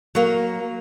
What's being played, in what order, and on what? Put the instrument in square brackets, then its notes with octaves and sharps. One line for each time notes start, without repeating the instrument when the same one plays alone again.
[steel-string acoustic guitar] F#3 A#3